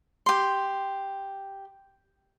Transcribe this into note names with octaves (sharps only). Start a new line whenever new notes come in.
G4 C6